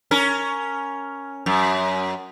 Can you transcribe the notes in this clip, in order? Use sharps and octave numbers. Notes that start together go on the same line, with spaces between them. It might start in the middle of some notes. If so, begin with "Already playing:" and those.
C#4 A#4
F#2